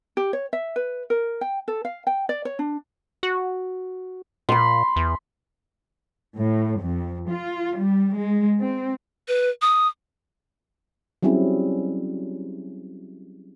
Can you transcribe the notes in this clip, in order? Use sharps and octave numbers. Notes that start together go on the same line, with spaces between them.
G4
C#5
E5
B4
A#4
G5
A4
F5
G5
D5
C#5
D4
F#4
A#2 B5 C6
E2
A2
F2
F4
G3
G#3
C4
B4
D#6
F#3 G3 C4 C#4 E4 G#4